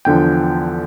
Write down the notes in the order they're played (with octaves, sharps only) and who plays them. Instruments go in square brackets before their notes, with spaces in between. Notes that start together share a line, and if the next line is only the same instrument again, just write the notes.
[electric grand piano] E2 D3 F3 G5